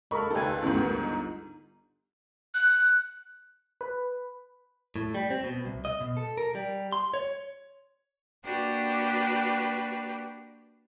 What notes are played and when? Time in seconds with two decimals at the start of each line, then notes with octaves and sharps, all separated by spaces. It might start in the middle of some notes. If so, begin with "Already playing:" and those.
0.11 G#3 A4 A#4 D#5 B5 C#6
0.31 C#2 D#4 G4 A4 B4 G#5
0.62 A1 D2 G#2 B3
0.85 G1 A#4
0.98 D#4
2.54 F#6
3.81 B4
4.96 A2
5.14 G3
5.30 C4
5.44 B2
5.65 C2
5.85 D#5
6.01 B2
6.17 A4
6.38 A#4
6.55 G3
6.92 C6
7.14 C#5
8.44 A#3 D4 F#4 G4 B4